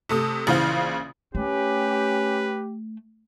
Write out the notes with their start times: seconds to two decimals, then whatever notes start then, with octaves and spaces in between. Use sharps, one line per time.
0.09 C3 A3 D#6
0.47 A#1 C#3 E3 C5 F5
1.35 A3 C#4 G4 B4